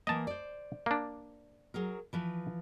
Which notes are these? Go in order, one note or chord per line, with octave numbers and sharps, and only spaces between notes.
E3 A#3 D#5 A5
C5 D5
A#3 D4
F#3 G#4 A#4
E3 F3 B4